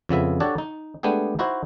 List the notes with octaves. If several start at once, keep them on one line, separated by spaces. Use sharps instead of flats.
F2 C#3 B3 E5
D4 F#4 G4 A4 C#5 D5
D#4
G#3 A3 B3 D4 G4 G#4
D#4 E4 F#4 C5 D#5